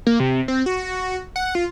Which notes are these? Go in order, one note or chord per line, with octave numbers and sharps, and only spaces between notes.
A#3
C3
C4
F#4
F#5
F4